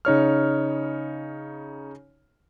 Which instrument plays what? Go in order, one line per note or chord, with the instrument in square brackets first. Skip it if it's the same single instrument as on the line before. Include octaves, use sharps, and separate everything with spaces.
[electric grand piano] C#3 D#4 C#5 F6